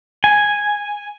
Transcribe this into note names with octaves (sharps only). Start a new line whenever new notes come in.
G#5